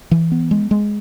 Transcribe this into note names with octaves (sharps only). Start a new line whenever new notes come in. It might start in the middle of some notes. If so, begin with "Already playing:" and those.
E3
B3
G#3
G#3